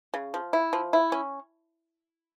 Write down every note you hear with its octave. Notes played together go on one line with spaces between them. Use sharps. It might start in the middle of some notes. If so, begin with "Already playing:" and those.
C#3
F3
E4
F3
E4
C#4